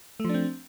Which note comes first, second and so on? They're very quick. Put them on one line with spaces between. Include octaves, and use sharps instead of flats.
A3 F3 D4 C4